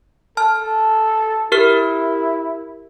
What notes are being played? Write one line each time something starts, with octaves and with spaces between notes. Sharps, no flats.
A4 A5 F6
E4 G4 A#4 F6